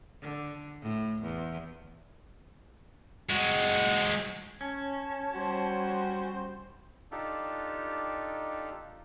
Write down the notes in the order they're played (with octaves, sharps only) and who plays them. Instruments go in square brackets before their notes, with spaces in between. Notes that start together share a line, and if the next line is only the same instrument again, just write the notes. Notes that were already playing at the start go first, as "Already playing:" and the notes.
[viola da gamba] D3
A2
E2
[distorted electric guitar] G#3 F#4
[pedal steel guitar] C#4 [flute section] C#5 A5
[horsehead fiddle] G3 C5 [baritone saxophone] F#4
[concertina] D4 D#4 F4 G4 A4